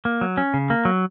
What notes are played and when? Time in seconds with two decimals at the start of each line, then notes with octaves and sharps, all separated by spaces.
0.05 A#3
0.21 F#3
0.37 C#4
0.54 C#3
0.70 A#3
0.85 F#3